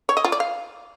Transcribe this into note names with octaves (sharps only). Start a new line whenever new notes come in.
C#5
D#5
F4
D5
F5